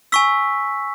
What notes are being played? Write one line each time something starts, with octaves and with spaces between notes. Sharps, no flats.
G#5 C#6 E6 B6